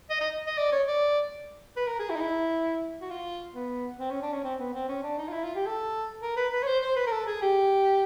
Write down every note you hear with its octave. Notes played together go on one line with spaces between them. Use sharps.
D#5
D#5
D#5
D5
C#5
D5
B4
A#4
G#4
E4
D#4
E4
F#4
F4
B3
C4
C#4
D4
C#4
C4
B3
C4
C#4
D4
D#4
F4
E4
F4
G4
A4
A#4
B4
B4
C#5
C5
C5
B4
A#4
A4
G#4
G4